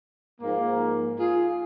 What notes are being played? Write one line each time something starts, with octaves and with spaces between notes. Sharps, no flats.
G#2 F3 A#3
F4 G#4